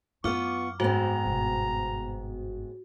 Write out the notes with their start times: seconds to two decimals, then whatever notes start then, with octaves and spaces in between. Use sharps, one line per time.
0.24 F#2 B3 F4 C#6 D6 F6
0.80 G#2 B3 C4 F#4 A#5
1.26 G1 B2